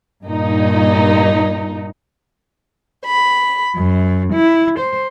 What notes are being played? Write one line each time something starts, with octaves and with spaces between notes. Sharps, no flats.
G2 A#2 D#4
B5
F#2
E4
C5